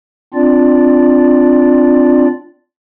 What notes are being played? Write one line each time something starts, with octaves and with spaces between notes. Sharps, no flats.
C4 D4 F4 D5